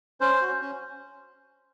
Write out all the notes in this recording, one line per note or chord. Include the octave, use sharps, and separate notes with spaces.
C#4 C5
F#4
C#4